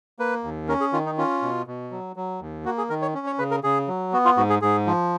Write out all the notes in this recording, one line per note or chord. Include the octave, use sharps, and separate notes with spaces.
A#3 B4
D#2
C#4 A#4
G#4
D#3 F4
D#4
C#4 F4
B2
B2
F#3
F#3
D#2
A#3 F#4
G#4
D#3 A#4
C#5
C#4
C#5
C#3 B4
A#4
C#3 G#4
F#3
B3 F#4
F4
G#2 F#4
G#4
G#2 G#4
F3